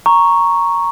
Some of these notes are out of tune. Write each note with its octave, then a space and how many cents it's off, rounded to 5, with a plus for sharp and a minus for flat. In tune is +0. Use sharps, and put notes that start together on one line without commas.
A#5 +0 C#6 +0